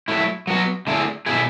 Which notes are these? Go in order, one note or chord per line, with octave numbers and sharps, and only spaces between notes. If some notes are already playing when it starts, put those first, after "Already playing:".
F#3 A3 E4
F#3 B3 F#4
D3 A3 E4 G#4 D5
B2 A3 E4 G#4